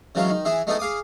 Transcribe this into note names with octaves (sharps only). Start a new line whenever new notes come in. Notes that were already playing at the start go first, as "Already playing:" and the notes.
C#3 E3 F#3 G#3 F4 C#5
D#3
E3 E4 G#4 E5
G#3 A3 B3 D#4 E4 A4
G#4 F5 D6 D#6